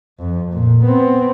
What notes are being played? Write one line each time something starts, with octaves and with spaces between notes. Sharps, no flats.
F2
A#2
B3 C4